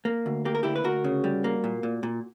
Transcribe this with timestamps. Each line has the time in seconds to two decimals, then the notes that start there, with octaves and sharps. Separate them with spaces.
0.05 A#3
0.26 D2
0.45 A#3 G4
0.55 A#4
0.63 D2 E4 G4
0.76 B4
0.84 D2 F#4 A#4
1.04 C#3
1.24 G3
1.44 A#3
1.64 A#2
1.83 A#2
2.03 A#2